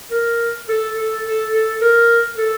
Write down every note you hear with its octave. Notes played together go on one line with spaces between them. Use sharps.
A#4
A4
A4
A4
A4
A#4
A4